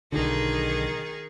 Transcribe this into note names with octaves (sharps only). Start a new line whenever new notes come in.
B1 D3 D#3 D#4 G#4